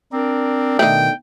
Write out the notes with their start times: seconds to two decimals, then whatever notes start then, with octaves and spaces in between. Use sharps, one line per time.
0.13 C4 D4 A#4 D5
0.79 B2 D#3 A3 D4 D#4 G5